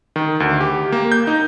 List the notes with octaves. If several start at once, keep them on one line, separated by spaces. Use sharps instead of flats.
D#3
D2
G4
A#3
G6
D#4